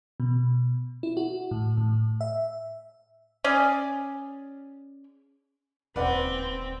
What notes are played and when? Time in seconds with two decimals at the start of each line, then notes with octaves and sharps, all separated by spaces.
0.20 B2
1.03 E4
1.17 F#4
1.51 A2
1.77 A2
2.21 E5
3.44 C#4 G#4 D5
5.96 D#1 D2 C4 B4 D5 F#5